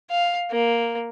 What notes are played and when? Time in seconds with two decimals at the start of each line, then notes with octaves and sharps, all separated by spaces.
0.11 F5
0.51 A#3